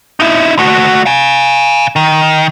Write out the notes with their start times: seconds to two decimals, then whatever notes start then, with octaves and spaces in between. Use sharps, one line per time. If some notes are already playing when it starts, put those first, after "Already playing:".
0.20 D#4 E4
0.59 A3 F#4
1.06 F5 G#5
1.96 D#3